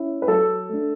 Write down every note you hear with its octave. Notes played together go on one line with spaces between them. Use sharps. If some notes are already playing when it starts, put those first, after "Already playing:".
Already playing: C#4 E4
B4
F#3 A4
A3 D4